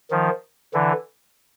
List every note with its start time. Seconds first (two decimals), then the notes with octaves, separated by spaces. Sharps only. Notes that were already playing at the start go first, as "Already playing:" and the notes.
0.11 D#3 F3
0.74 D3 E3